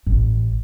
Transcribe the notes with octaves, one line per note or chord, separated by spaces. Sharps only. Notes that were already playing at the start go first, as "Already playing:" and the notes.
A1